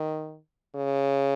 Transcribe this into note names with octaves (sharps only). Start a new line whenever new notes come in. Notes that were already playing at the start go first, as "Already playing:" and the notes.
Already playing: D#3
C#3